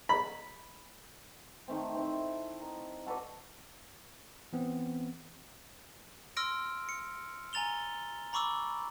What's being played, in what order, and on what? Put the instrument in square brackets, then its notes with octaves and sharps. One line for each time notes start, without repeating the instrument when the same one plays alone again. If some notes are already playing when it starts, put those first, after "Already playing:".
[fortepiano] B5
[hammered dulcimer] D#3 A3 C4
C4 E4
A#4 D#5
F#4 A4 B4 D5
[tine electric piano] E3 B3 C4
[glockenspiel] C6 E6 F6 A#6 D7
C#7
G#5 A#5 A6 F7 G7
A#5 B5 C#6 D6 E6